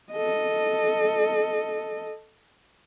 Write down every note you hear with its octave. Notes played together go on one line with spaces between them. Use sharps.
A4 D#5